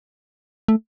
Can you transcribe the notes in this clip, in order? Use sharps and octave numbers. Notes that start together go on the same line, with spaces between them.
A3